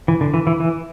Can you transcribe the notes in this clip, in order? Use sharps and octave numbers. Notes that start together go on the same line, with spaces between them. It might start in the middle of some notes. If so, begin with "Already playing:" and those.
E3
D3
E3
E3
E3